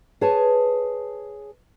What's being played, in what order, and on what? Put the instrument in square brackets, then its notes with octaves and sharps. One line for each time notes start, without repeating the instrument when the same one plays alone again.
[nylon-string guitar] G#4 B4 C#5 A5